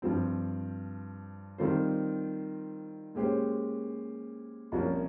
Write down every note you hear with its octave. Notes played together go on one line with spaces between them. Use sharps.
G2 F3 C4
D#3 G3 C4 F4 C5
A#2 G#3 C#4 G4 C5
C2 A#2 F3 A#3 C#4